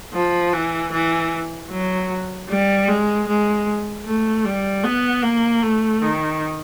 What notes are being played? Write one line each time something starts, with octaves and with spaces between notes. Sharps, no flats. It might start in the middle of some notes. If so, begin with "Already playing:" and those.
F3
E3
E3
F#3
G3
G#3
G#3
A3
G3
B3
A#3
A3
D#3